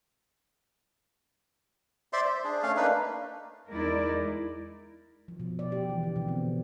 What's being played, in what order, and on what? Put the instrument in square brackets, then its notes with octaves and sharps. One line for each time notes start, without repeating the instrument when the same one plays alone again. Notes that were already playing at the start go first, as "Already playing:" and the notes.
[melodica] C5 D5 E5 C6
C5
D4 G#4
A3 C#4 F5
A#3 D4 D#4 B4
[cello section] E2 G#3 D#4 E4 A#4 D5
[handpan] F3
B2
D5
G4
E3
D3
B2
C4